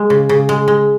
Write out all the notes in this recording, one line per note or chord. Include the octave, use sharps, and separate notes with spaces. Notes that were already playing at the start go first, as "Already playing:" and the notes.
Already playing: G#3
C#3
C#3
G#3
G#3